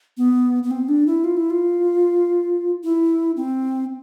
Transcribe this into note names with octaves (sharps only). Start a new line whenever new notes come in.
B3
B3
C4
D4
E4
F4
E4
F4
E4
C4